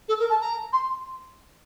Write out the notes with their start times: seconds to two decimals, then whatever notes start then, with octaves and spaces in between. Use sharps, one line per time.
0.08 A4
0.19 A#4
0.29 A5
0.41 A#5
0.72 C6